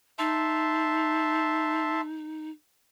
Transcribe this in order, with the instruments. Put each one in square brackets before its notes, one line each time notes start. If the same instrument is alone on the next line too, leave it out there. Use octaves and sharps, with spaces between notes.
[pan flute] D#4 [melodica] E5 A5 C6